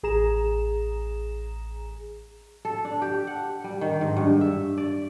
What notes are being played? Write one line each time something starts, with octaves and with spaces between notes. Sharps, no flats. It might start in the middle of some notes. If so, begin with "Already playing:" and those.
A1 G#4 A#5 E7
A4
D4
G4
F#5
G3
D#3
G#2
G2
E5
D5